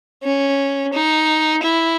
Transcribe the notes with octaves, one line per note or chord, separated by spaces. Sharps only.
C#4
D#4
E4